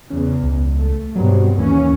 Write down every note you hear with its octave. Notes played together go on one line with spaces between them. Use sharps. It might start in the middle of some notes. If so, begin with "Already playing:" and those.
E2 C#3
C#2
A3
G2 B2 F#3 C4
D#2 E3 A#3 C#4